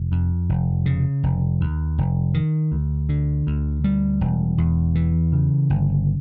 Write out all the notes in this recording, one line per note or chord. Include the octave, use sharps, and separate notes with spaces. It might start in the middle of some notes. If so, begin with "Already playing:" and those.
Already playing: F1
F2
F1
C#3
F1
D#2
F1
D#3
D2
D3
D2
G3
E1
E2
E3
C#3
G1